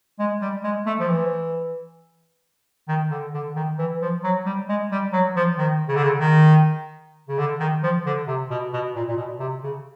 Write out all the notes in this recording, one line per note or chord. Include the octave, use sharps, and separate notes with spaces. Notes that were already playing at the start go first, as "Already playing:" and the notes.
G#3
G3
G#3
A3
F3
E3
D#3
D3
D3
D#3
E3
F3
F#3
G3
G#3
G3
F#3
F3
D#3
C#3
D3
C#3
D#3
C#3
D3
D#3
F3
D3
C3
B2
B2
A#2
A#2
B2
C3
C#3